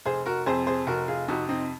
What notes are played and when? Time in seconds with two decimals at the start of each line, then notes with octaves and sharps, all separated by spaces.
0.06 F1 G#4 C5
0.26 F#4 A#4
0.46 F2 C3 G#4 C5
0.67 G#4 C5
0.87 F1 F#4 A#4
1.08 F4 G#4
1.28 F2 C3 D#4 F#4
1.49 C4 D#4